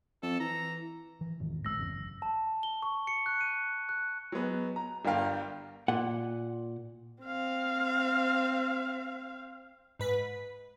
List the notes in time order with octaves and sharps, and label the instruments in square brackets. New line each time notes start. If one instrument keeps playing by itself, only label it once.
[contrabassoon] F2 [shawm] A4
[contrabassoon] E3 [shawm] A#5
[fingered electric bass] E3
E1 G#2 D#3
[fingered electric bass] A1 D2 G#3 [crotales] E6 A#6
[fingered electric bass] G1 E2 C#3
F#1
[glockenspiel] A5
G7
C#6
C#7
F#6
D#7
F#6
[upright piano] F#3 G#3 B3
A#5
G1 G2 A#4 F5 G5
[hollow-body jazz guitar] A#2 F#5
[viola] C4 F5
[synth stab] G#2 B4 B6